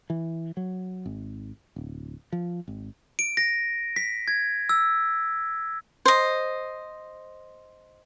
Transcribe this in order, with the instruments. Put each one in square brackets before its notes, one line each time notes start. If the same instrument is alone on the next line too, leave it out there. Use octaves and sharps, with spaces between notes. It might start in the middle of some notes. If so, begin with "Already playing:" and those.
[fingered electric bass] E3
F#3
G#1
D1
F3
G#1
[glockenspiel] D7
A#6
B6
G#6
E6
[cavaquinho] C5 D#5